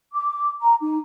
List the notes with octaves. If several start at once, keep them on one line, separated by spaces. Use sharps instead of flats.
D6
A#5
D#4